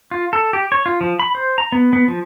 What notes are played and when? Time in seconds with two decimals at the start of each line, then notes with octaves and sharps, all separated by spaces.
0.11 F4
0.33 A4
0.53 G4
0.72 C#5
0.86 F4
1.01 F3
1.20 B5
1.35 C5
1.58 A#5
1.72 B3
1.93 B3
2.08 F3